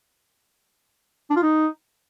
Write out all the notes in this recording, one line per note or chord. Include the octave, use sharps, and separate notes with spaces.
D4
F4
D#4